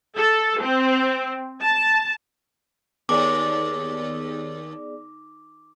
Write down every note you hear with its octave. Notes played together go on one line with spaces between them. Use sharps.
A4
C4
A5
D#2 B3 G#4 D5 D6